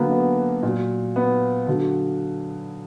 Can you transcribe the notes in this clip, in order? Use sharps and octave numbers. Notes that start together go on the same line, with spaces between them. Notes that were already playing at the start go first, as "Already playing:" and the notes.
Already playing: D3 F#3 A#3 B3
B3
A#2 F#3
B3
D3 F#3